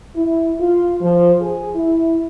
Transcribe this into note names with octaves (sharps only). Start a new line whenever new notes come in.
E4
F4
F3
G#4
E4